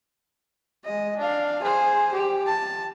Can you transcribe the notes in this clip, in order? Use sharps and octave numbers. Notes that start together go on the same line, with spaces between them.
G#3 D#5
D4 F5
G#4 C5
G4
A5